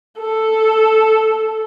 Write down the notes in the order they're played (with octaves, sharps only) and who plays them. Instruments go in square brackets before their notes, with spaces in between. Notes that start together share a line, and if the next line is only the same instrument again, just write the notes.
[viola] A4